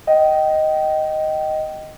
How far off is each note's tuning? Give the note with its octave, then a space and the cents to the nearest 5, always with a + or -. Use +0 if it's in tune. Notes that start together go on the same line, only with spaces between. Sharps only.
D#5 +0 G5 -25